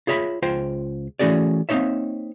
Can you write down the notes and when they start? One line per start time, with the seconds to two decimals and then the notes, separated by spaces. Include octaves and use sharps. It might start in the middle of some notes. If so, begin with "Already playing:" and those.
0.07 F4 G#4 C#5 E5 A#5 B5
0.42 C#2 F4 C5 G5
1.19 E3 A3 C#4 F#4 G#4 D5
1.69 A#3 C4 D4 D#4 C#5 E5